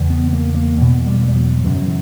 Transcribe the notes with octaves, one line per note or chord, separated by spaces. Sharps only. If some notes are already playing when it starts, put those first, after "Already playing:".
Already playing: E2 C#3
B3
A#3
A#3
E2 B2
G3
A#3
G3
F#3
F#2 C#3 E3
F#3
E3